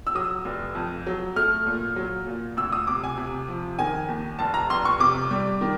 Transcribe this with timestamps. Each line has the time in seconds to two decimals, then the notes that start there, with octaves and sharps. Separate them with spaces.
0.07 E6
0.15 F#3 D#6
0.45 F1
0.75 F2
1.07 F#3
1.36 A3 F6
1.66 A#2
1.96 F#3
2.27 A#2
2.57 D2 E6
2.72 D#6
2.87 C3 D6
3.04 G#5
3.17 C3
3.48 F3
3.79 D#3 G#5
4.09 D#2
4.39 F1 A5
4.54 A#5
4.70 F1 C6
4.85 C#6
5.00 C3 D6
5.31 G3
5.61 D#3